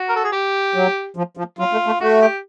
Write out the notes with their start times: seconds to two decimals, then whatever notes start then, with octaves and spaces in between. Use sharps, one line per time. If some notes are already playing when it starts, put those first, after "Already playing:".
Already playing: F#4
0.09 A#4
0.16 A4
0.24 G#4
0.32 G4
0.75 F#3
1.17 F3
1.37 F3
1.59 F#3 F4
1.72 A3
1.86 A3
2.00 A3 F#4
2.22 G4